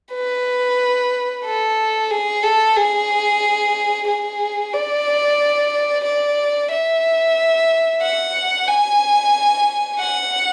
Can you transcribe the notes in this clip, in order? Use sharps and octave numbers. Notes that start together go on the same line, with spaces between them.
B4
A4
G#4
A4
G#4
G#4
D5
D5
E5
F#5
G#5
F#5